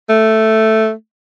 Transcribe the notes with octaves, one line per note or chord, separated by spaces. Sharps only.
A3